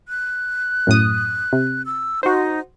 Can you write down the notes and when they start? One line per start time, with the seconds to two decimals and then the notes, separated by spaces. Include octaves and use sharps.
0.08 F#6
0.87 F#2 A2 D#6
1.53 C3
1.86 E6
2.23 D#4 F#4 C5